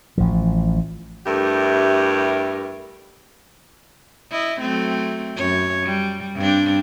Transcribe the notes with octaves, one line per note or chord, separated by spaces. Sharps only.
A1 F3
G2 A3 E4 G4 A#4
E4 D#5
F#3 A3 C4
F#2 C#5
G3
G2 C4 D4